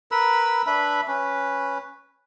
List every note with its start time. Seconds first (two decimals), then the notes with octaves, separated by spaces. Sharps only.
0.11 A#4 B4 B5 E6
0.67 D4 B4 E5 B5
1.08 C#4 B4